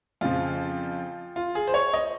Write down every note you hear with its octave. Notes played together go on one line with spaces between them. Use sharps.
F2 C#3 F3 F4
F4
G#4
C5
C#5
D#5